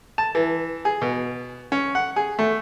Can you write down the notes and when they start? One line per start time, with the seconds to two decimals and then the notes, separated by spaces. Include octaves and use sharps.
0.18 A5
0.35 E3
0.85 G#4
1.02 B2
1.72 C#4
1.95 F#5
2.16 G#4
2.39 A3